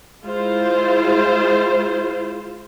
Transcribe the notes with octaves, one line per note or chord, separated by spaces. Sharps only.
G#3 E4 F4 C5